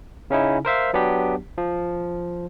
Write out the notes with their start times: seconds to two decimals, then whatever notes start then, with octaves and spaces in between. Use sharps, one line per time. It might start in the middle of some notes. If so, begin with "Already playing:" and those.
0.30 C#3 C#4 D#4 E4
0.65 A#4 C5 E5 F5
0.93 F#3 B3 D4 G4
1.58 F3